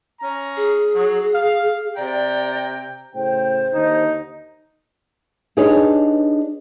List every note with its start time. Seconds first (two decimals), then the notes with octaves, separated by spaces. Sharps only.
0.20 C#4 A#5
0.56 G#4
0.95 F#3
1.34 F5
1.97 C3 D5 G5 A#5
3.15 A2 C#3 C5 G5
3.74 D#2 D3 D#4
5.57 D4 D#4 G4 G#4 B4 C#5